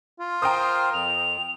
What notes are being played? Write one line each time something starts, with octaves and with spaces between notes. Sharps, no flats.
F4
A#4 C5 G5 A#5 D#6
F2 F7